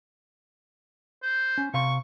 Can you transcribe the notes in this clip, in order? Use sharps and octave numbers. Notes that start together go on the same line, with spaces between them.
C5
C#4
C3 F5 C6 C#6